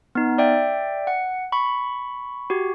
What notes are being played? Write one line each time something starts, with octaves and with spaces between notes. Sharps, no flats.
B3 D#4
D5 E5 G5
F#5
B5 C#6
F#4 G4